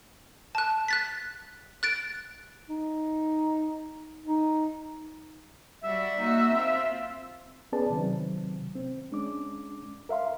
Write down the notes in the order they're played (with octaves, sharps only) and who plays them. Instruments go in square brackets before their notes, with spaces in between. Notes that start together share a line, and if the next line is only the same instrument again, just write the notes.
[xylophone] A5 F#6
F#6 A6 B6
F#6 A6 D7
[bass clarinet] D#4
D#4
[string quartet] G3 F#4 D5 [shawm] E5
[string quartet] A#3 D#4 F#4
C4 F4
[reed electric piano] B3 C#4 G#4 B4 D5 A5
C3 D#3 F#3 C4
C4
G#3 C#4 D4 D6
A#4 E5 F5 C6